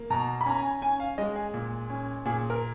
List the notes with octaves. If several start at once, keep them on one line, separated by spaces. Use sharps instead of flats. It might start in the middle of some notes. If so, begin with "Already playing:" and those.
Already playing: A#3
B2 A#5
B5
C#4 A#5
G#5
C#4 G#5
F5
G#3 D#5
G#4
A#2
C#4
A#2 G#4
A#4